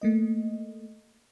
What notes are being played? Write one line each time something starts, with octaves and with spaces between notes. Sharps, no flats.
A3 A#3 D#5